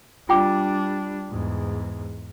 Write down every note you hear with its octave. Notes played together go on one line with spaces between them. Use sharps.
G3 D4 F4 G5 D6
E2 G#2